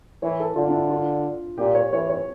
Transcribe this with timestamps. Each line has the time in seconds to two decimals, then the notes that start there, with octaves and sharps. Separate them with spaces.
0.22 E3 C#5
0.40 A4
0.56 D3 F4
0.68 D4
0.73 E4
0.90 F4
1.58 A#2 G4
1.75 C#5
1.92 E3 C#5
2.09 C#5